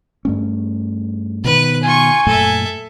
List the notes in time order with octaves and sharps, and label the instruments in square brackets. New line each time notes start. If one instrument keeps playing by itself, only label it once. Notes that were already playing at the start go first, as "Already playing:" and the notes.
[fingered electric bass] G2 A3 C#4
[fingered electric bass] B2 D#3 B3 [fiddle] B4 F#6
[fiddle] F4 C#6 [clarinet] G#5
[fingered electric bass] F#2 A#2 A3 [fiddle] A4 E5